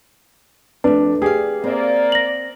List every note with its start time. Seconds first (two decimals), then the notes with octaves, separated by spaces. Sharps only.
0.84 F2 A3 D4 B4
1.22 G4 G#4 D5 F5
1.64 A#3 C4 D5 E5
2.12 A#6 F#7